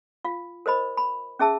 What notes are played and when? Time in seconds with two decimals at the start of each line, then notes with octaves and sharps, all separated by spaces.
0.25 F4 F5
0.66 A#4 C5 D#5 B5
0.97 B5
1.39 C#4 G#4 E5 A5 E6